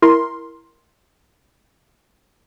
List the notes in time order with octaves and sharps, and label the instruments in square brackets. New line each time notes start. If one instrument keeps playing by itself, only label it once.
[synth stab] E4 A#4 C6